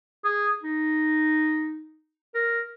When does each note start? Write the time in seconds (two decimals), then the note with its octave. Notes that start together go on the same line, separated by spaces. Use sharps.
0.24 G#4
0.63 D#4
2.34 A#4